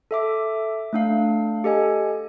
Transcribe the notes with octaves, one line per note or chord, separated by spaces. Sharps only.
A4 E5 D6
A3 D4 F5
G4 A4 D#5 G#5